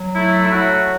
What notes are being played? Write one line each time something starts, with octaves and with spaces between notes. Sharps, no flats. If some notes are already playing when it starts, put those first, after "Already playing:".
Already playing: F#3
A3 E4
E4
F#3 F#4